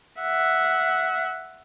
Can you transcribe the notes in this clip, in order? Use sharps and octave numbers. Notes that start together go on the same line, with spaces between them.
E5 F#5